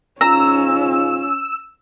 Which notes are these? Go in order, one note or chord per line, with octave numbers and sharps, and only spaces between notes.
G#2 C#3 C#4 F4 A#5 E6